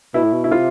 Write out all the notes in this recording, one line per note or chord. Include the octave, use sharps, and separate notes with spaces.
B2 E4
A2
B2
E4
C3 F4